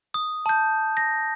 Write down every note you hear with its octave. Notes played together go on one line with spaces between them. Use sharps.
D#6
A5 G6
A#6